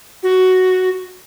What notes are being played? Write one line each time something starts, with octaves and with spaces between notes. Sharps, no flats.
F#4